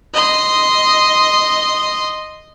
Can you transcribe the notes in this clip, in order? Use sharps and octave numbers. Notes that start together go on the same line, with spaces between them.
D#5 C6